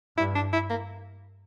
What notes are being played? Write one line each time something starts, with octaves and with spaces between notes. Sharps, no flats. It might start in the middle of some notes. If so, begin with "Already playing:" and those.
G2 E4
D4
E4
A#3